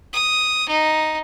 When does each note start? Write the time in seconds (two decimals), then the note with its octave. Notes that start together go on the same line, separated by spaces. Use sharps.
0.13 D#6
0.69 D#4